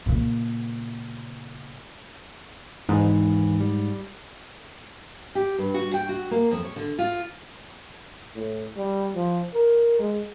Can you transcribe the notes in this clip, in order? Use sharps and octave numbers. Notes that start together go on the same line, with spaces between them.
A#2 C#3
D#2 G#2 E3
G3
G4
G2
F#4
G5
F#4
A#3
F2
C#5
D3
F4
A2
G3
F3
A#4
G#3